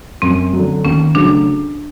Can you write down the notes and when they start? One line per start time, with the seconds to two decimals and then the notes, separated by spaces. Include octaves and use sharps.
0.22 F#2 C4
0.53 D3 F#3
0.85 D#2 C#4
1.15 C#3 F#3 A3 D4